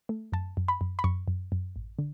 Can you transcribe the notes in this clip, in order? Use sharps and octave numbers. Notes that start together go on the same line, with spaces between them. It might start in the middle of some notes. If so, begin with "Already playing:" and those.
A3
F#2 A5
F#2
B5
F#2
B5
F#2 C#6
F#2
F#2
A1
D3